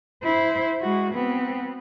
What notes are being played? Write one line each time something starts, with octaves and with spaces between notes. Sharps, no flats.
E4 C5
G#3 F#4
B3 C4